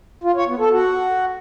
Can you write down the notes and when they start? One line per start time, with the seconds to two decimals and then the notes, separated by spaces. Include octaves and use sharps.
0.24 F4
0.35 C#5
0.47 B3
0.59 A4
0.71 F#4